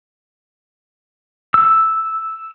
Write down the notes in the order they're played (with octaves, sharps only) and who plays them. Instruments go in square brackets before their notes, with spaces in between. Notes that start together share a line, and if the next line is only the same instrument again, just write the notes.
[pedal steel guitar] E6